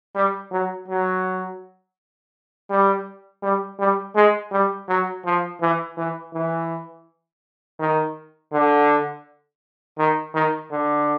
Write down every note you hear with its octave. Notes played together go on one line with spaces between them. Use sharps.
G3
F#3
F#3
G3
G3
G3
G#3
G3
F#3
F3
E3
E3
E3
D#3
D3
D#3
D#3
D3